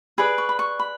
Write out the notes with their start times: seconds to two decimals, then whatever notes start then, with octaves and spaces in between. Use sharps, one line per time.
0.18 G#4 B4 D5 B5
0.38 C#6
0.49 B5
0.59 C#6
0.79 B5